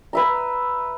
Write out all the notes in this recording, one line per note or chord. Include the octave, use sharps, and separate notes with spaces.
B4 E5 A#5